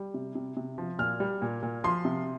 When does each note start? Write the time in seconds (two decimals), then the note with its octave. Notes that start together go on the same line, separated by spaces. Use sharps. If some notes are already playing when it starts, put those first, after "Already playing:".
Already playing: G3
0.14 C3
0.35 C3
0.57 C3
0.78 F3
0.99 A#2 F6
1.20 G3
1.42 A#2
1.63 A#2
1.84 F3 C6
2.05 C3